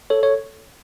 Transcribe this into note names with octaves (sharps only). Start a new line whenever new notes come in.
A4 C#5
C#5